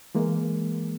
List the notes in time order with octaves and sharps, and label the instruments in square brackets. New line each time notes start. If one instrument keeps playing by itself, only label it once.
[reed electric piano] E3 G#3 A#3